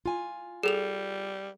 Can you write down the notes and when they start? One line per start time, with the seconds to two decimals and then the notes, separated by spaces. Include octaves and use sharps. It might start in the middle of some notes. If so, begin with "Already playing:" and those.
0.06 F4 G#5
0.63 G3 G#4 A4 F7